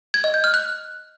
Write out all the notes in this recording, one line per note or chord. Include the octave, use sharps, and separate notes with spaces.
G#6
D#5
G6
F6
F#6